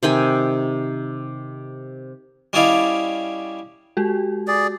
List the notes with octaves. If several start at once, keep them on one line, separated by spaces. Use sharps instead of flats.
C3 D#3 G5 G#5
G3 C#4 E4 D5 D#5 F5
G#3 F#4 G4
G#4 D5